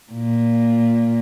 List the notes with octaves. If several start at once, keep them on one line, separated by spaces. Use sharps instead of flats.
A#2